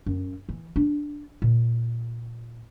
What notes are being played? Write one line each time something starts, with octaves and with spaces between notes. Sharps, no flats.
F#2
E3
D4
A#2